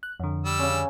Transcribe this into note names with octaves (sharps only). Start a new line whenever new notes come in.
F#6
F2 D3
G3 E6
C#3 C#4